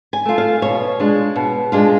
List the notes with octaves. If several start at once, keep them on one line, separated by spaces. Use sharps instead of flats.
G#5
A3 F4
F5
B2 C#5
G#3 D4 F4
B2
G#3 D4 F4